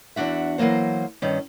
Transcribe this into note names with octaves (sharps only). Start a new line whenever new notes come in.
E2 B2 D4 F#4 E5
E3 F#3 A3 A#3 C5
G2 D#3 C#4